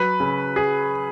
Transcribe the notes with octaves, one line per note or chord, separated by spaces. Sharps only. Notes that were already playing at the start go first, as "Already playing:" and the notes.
Already playing: F#3 B4
C#3
G#4